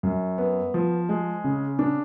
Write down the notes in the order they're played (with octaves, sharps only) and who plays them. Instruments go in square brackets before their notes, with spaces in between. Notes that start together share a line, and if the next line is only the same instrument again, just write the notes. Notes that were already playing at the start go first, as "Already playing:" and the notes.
[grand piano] F#2
B3
F3
G#3
C#3
D4